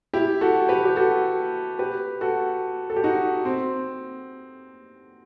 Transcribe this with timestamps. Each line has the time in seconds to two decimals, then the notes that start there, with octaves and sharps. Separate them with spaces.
0.13 E4 G4
0.41 F#4 A4
0.69 G4 B4
0.86 G4
0.96 F#4 A4
1.79 G4 B4
2.21 F#4 A4
2.90 A4
2.96 G4
3.04 D#4 F#4
3.45 C4